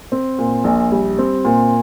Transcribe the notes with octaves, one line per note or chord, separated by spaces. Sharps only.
C4
A#2
A#1
G3
C4
A#2